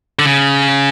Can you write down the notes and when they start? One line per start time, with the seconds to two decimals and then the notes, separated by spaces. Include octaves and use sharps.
0.19 D3
0.25 C#3